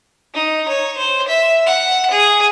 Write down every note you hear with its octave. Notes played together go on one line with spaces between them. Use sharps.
D#4
C#5
C5
E5
F#5
G#4